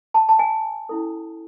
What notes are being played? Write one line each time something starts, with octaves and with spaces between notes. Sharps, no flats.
A5
A5
G#5
C#4 E4 A4